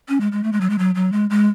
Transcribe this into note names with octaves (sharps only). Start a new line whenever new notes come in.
C#4
G#3
G#3
A3
G#3
F#3
G#3
F#3
F#3
G#3
G#3